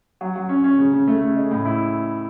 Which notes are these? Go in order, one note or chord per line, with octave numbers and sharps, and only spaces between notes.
F#3
F#3
C#4
C#4
C#3
C#3
A3
C#3
G#3
A2
E4